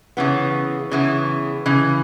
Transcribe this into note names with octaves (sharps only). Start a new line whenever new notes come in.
C#3 E3 B3
C#3 E3 B3
C#3 E3